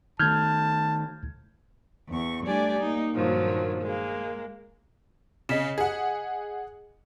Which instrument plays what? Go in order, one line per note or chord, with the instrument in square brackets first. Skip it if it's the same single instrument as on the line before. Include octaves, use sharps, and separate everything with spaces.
[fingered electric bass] D#3 A3 [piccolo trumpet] A5 [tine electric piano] F6 G6 G#6
[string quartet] E2 C#6
G3 A3 D4 G4 D5 G#5
A#3 D#4
G2 A#2 D#3 F3 F#3
G#3 A#3
[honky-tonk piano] C#3 [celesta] D#5 B6 E7
[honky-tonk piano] G#4 F#5